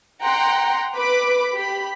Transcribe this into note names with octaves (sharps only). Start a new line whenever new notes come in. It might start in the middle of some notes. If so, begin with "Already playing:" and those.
F#5 G5 A#5 C6
B4 B5 D6
G4 B5